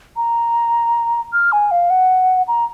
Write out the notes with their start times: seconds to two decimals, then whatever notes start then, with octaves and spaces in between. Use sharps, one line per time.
0.17 A#5
1.33 F6
1.52 G#5
1.71 F5
1.90 F#5
2.48 A#5